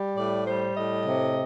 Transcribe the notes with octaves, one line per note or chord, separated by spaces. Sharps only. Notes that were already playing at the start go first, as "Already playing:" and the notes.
Already playing: G3
A2 D5
G3 C5
A2 D#5
C3